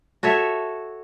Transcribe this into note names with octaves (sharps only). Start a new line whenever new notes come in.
F#4 A4 C#5 E5